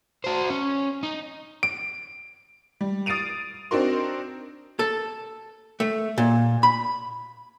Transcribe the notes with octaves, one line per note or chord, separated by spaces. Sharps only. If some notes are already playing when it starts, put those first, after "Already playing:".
F#4 C5
C#4
D#4
D7
G3
D#6 A6 C7 D7 D#7 F7
C4 D4 D#4 F#4 A#4 C6
A4
A3
A#2
B5